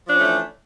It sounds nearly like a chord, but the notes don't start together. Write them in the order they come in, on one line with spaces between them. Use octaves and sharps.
F3 D4 C#4 A3 E3